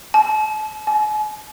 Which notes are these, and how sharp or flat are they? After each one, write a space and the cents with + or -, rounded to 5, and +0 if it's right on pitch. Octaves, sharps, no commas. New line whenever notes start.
A5 -40
G#5 +40